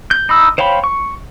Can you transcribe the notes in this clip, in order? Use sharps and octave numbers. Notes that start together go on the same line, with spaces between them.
G6
D#4 B5 E6
C5 C#5 F5 G5 B5
C#6